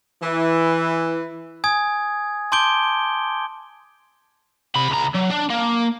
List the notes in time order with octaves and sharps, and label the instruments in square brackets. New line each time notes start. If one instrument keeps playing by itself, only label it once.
[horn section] E3
[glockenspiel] G#5 D#6 G#6
A5 C6 D6 G6 D7 G7
[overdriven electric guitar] C3 B5
C#2 A#5
F#3
D4
A#3